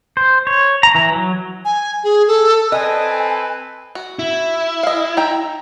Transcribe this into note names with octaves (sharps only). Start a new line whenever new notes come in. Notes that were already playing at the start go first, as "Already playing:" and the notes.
C5
C#5
A#5
E3
F#3
G#5
G#4
A4
C4 A4 B4 D#5 G#5
F#4
E4
D#5 F5
D#4 G5 A#5